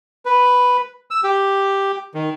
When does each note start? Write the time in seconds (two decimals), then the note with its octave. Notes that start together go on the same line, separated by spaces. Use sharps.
0.25 B4
1.11 E6
1.24 G4
2.15 D#3